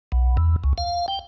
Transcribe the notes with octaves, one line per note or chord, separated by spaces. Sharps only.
B1
E2
C#2
F5
G5